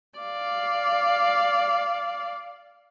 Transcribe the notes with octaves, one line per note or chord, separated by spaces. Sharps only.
D5 F5